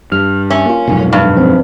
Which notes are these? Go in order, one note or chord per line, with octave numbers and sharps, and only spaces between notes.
G2 F6
C#4 E5
A#3 F4
F1 B1 G#2
G2
F3 C4